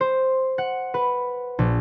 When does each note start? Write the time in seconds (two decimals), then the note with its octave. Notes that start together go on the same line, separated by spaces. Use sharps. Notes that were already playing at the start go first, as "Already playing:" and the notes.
0.01 C5
0.58 F#5
0.94 B4
1.59 A#1